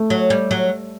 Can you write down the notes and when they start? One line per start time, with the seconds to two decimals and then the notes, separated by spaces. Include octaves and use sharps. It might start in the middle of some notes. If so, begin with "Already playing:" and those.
Already playing: A3
0.10 F#3
0.30 G3
0.51 F#3